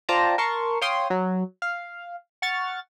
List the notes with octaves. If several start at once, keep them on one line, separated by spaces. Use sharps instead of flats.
F4 C5 D5 G5 A5 A#5
A#4 A5 C6 C#6
C#5 F5 G5 C6 D#6
F#3
F5
F#5 C#6 F6 A6